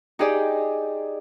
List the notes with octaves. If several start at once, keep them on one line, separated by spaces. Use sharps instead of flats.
D#4 G4 G#4 D5